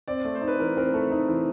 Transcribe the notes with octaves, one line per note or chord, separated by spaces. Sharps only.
C4 D5
A3
C5
D#4
B4
E3 A#4
C4 A#4
A3 A4
D#4
E3